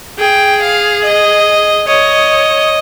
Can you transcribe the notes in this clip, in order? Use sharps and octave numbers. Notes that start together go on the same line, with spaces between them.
G#4 G5
F5
D#5
C#5 D#5